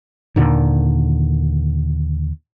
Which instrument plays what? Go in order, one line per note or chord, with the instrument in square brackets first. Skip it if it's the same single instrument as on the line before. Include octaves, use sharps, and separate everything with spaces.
[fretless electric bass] D#2 A#2 D3 D#3